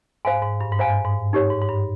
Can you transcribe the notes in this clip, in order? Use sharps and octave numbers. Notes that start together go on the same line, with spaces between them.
G#2 C5 F5 G#5
G#2
G2
G#2
G2 C5 F5 G#5
G#2
D#4 G4 C#5
G#2
G#2
G2